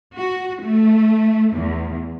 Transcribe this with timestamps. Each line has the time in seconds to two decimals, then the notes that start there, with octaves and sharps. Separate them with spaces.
0.15 F#4
0.61 A3
1.54 E2